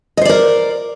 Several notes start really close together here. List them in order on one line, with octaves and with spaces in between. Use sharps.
D#5 C5 D5 A#4